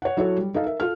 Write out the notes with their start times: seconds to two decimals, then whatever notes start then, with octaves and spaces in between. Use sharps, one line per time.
0.02 C#5 F#5
0.17 F#3 E4 F#4 A4 C#5
0.38 G3
0.54 D#4 A4 D#5 F5
0.66 A#4 E5
0.80 F4 A4 F6